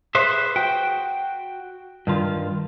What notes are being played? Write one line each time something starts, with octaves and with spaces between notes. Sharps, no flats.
G#4 B4 C5 E5
F#4 G5
G2 D#3 F4